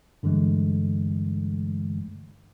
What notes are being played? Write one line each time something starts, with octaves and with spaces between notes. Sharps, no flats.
G2 D3 E3 G#3 A3